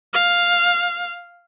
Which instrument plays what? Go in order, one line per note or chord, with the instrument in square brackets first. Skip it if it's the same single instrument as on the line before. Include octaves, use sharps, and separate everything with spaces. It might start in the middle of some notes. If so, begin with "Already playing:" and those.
[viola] F5